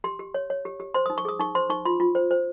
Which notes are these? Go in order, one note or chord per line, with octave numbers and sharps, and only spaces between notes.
G4 C6
G4
C#5
C#5
G4
G4
C5 C6
D#6
D#4
C#6
G#4 D#6
D#4 C#6
C5 C6
D#4 C#6
F4 C6
F4
C5
C5